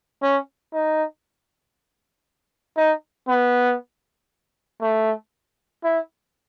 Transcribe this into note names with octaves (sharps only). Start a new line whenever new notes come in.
C#4
D#4
D#4
B3
A3
E4